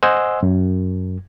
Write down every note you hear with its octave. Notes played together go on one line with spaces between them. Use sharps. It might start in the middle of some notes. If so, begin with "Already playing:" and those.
C5 D#5 F#5 G#5 C6 E6
F#2